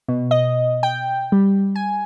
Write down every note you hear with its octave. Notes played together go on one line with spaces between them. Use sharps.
B2
D#5
G5
G3
G#5